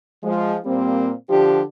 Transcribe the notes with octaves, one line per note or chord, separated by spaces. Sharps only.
F3 G#3
A#2 G3 A#3 C4
D3 F3 D4 G4